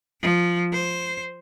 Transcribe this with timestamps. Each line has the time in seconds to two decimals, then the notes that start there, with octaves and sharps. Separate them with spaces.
0.21 F3
0.73 C5